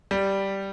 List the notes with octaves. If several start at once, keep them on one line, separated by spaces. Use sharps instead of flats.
G3